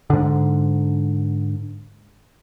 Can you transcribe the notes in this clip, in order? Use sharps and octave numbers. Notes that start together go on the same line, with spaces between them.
G#2 D3